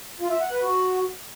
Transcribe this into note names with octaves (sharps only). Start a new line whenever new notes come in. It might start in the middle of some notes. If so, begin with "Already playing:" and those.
F4
E5
F#5
B4
F#4